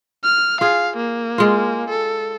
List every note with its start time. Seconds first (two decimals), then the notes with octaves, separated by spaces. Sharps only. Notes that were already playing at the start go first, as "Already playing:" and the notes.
0.24 F6
0.61 F4 G#4 F5
0.96 A#3
1.38 G#3 F4
1.90 A4